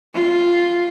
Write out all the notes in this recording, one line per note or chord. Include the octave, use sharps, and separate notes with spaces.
F4